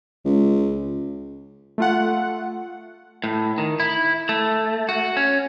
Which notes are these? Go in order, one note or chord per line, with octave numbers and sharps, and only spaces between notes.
C#2
A3 F4 F#5
A2
D#3
E4
A3
F#4
C#4